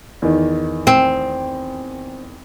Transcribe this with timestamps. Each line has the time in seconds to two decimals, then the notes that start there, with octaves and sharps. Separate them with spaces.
0.22 E2 D#3
0.87 C4